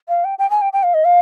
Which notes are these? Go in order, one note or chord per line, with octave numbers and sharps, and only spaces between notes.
F5
G5
G5
G#5
G5
G5
F5
D#5
F5